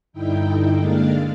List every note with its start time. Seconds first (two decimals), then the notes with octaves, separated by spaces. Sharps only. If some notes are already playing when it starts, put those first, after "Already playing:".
0.13 G2 D3 D#4 E4 G5
0.77 D3 G#3 A#3 D4 F5 A6